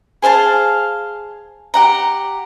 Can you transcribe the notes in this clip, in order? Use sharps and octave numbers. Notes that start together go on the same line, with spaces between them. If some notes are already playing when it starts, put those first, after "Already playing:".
G#4 C5 F5 A5
G4 F#5 A#5